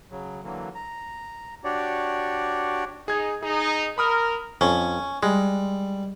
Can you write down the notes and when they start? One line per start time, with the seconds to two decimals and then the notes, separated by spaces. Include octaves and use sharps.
0.11 C#3 F#3
0.43 D3 E3 F#3 A#3
0.75 A#5
1.64 D4 F#4 G4 C#5 D5
3.08 D#4 G#4 G#6
3.43 D#4 G#4
3.98 A#4 B5 D#6 F6
4.61 F2 C#4
5.23 G3 G#3